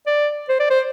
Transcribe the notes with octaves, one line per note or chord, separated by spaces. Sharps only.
D5
C5
D5
C5